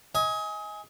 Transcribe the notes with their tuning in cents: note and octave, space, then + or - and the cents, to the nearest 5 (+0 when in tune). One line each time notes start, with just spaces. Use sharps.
D#5 +30 G#5 +0